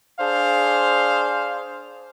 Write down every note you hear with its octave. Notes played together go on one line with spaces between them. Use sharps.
D4 G#4 C5 F5